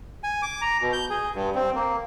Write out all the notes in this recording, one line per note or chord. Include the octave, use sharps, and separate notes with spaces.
G#5
D6
A#5
B2
G6
G#4
G2
C4
A#3